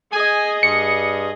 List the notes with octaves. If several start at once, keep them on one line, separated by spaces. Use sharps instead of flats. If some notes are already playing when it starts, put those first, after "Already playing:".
G#4 D#5 G#5
G2 C#7